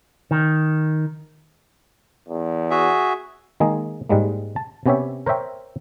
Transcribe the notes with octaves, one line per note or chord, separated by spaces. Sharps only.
D#3
E2
F#4 G#4 E5
D#3 G#3 A#3 G#4
G#2 G3 G#3 A#3
A5
C3 B3 C#4 G4 C#5 E5
A#4 C5 C#5 E5 G5